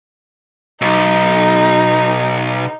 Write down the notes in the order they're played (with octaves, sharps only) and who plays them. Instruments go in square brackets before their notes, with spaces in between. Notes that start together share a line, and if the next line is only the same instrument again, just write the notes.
[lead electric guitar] B1 [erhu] D#4